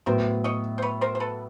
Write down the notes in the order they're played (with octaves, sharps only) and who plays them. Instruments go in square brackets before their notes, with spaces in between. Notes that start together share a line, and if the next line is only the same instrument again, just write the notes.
[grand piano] A2 F#3 B3 [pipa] A#4 C5
[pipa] C#5 D#5
C5
B4 C#5
A#4 C5
C5
A4 B4